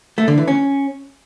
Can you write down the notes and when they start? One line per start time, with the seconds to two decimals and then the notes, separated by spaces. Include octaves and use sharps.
0.18 A3
0.28 D3
0.38 E3
0.48 C#4